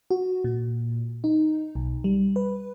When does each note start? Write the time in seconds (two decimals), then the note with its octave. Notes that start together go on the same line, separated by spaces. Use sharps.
0.11 F#4
0.44 A#2
1.24 D#4
1.75 B1
2.04 G3
2.36 B4